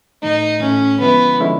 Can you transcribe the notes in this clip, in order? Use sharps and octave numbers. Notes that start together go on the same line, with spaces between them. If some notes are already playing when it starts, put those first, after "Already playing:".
A2 E3 A3 D#4
A2 E3 A3 C#4
D3 F3 G#3 B3 C#4 E4
D3 F3 G#3 C#4 E4